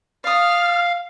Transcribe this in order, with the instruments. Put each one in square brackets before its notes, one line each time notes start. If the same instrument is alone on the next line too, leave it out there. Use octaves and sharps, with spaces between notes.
[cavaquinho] D5 D#6 [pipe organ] F5 [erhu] F6